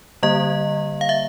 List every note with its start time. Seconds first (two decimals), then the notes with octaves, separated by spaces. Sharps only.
0.23 D3 G3 A#3 D#5
1.01 F5
1.09 E5